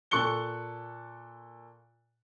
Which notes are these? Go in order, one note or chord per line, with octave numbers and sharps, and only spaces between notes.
A#2 A4 C#6 F#6 C#7 G7